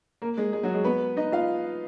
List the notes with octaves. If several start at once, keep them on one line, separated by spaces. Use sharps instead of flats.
A#3 A#4
G#3 G#4
G#3 G#4
F#3 F#4
G#3 G#4
B3 B4
D#4 D#5
F4 F5